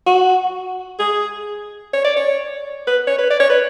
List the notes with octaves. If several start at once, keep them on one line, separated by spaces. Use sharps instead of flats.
F#4
G#4
C#5
D5
C#5
B4
C#5
B4
D5
C#5
B4